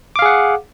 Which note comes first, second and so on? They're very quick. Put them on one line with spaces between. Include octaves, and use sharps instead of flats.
D6 F5 G#4 F#5